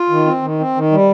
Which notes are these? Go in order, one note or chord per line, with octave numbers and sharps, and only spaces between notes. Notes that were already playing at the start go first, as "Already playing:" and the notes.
Already playing: F4
D#3
C4
D#3
C4
D#3
G3